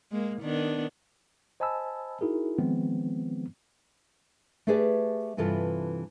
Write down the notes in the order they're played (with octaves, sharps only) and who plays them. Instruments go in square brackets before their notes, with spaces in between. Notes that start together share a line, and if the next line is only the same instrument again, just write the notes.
[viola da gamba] G#3 A#3
D#3 B3 D4
[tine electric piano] C5 D#5 G#5 A5 B5 E6
D#4 E4 F#4 G#4 A#4
D#3 F3 G#3 B3 C4
[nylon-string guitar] A3 G4 G#4 B4 D5 E5
G2 C3 E3 F4 A4 B4